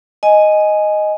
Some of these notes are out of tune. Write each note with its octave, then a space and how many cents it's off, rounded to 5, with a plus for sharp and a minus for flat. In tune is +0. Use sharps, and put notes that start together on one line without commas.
D#5 +0 G#5 +5